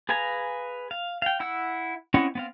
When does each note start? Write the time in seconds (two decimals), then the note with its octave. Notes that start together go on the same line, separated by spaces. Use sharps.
0.09 G#4 B4 F5 G#5 A#5
0.91 F5
1.22 F5 G5
1.40 E4 F#5 E6
2.14 C4 C#4 E4 D#5 F#5
2.35 B3 C4 F5